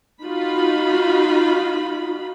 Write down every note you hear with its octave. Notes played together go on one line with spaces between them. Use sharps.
D#4 F4 F#4 B5